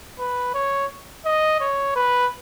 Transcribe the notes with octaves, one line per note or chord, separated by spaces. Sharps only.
B4
C#5
D#5
C#5
B4